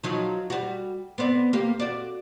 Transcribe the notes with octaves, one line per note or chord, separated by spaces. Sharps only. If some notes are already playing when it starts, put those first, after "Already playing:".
F3 F#3 D#4
G3 F#4
B3 C4 D5
A#3 G4
F#4 D5